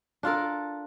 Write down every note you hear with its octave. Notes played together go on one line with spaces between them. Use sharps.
D4 F4 A4 A#4